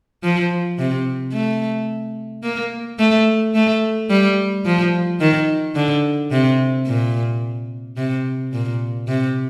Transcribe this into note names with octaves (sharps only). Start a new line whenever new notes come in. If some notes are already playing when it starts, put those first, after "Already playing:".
F3
C3
A3
A#3
A3
A3
G3
F3
D#3
D3
C3
A#2
C3
A#2
C3